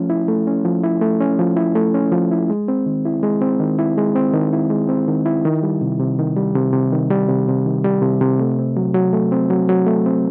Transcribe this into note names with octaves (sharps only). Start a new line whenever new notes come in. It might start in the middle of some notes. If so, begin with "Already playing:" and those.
Already playing: F3 A3 C#4
E4
A3
C#4
F3
E4
A3
C#4
F3
E4
A3
C#4
F3
E4
G#3
C4
D#3
E4
G#3
C4
D#3
E4
G#3
C4
D#3
E4
G#3
C4
D#3
E4
D#3
G3
C3
C3
D#3
G3
C3
C3
D#3
G3
C3
C3
D#3
G3
C3
C3
A3
C4
F#3
F#3
A3
C4
F#3
F#3
A3
C4